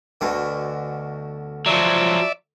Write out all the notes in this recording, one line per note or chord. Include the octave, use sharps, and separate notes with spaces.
D2 B2 D3
F3 F#3 D5 E5